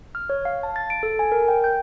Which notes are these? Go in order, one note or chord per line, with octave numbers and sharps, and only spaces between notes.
F6
C#5
F5
A5
A6
D7
A4
G#5
A#4
G5
G6